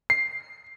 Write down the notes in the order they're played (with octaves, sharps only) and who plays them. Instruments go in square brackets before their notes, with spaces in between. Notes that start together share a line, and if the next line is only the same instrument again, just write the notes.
[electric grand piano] C7